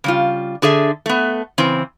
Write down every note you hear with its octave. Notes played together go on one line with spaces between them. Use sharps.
C#3 G3 F4
D3 G#4 A4 E5
A3 B3
C#3 E3 C4